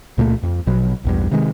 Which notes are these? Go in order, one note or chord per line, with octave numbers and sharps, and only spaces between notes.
C#2 A#2 F3 A3
F2
A#1 B2 F#3
A#1 E2 G2
C3 D#3 G#3